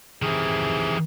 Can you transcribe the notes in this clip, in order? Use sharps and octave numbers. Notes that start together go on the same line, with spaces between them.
C3 D#3 E3 G#4